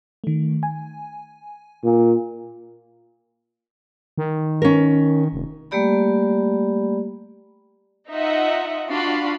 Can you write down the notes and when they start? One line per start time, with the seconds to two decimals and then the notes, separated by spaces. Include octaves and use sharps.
0.24 D#3 A3
0.63 G#5
1.84 A#2
4.18 D#3
4.62 C#4 A#4
5.32 F1
5.71 G3 A3 A#3 G4 D5 B5
8.10 D#4 F4 D#5 E5 F#5
8.89 D4 F4 F#4 F5 B5 C7